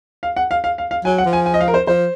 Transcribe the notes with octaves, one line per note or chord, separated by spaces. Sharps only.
F5
F#5
F5
F5
F5
F5
F#3 G#5
F#5
F3
G#5
G#5
D#5
F5
A#4
C5
F3 C5